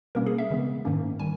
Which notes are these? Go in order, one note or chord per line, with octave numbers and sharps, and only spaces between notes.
B2 G3 A#3 C#4 A#4
G#4
E5
C#3 E3 G#3 B3
G#2 D#3 A#3 C#4
D#3 G3 G#5